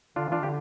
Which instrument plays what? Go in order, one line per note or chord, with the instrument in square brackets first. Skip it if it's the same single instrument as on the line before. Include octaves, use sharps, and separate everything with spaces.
[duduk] D3 [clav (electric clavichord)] D4 F4
[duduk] E3 [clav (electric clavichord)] D4 F4
[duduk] D3 [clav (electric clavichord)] G4